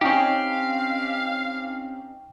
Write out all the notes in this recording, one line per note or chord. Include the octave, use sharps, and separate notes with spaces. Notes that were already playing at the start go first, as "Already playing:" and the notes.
C4 C#4 D#4 G4 F5 G5